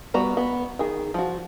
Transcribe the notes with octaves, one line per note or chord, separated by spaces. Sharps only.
G3 B3 F#4 A#5
B3
D#3 G#4
F3 F#4